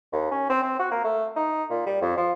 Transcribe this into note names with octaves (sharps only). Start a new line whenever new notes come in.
D#2
C#4
C4
C4
F#4
A#3
A3
D#4
A#2
G3
F2
F3